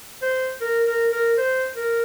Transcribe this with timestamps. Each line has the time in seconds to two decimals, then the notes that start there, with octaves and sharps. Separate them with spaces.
0.22 C5
0.61 A#4
0.86 A#4
1.12 A#4
1.37 C5
1.75 A#4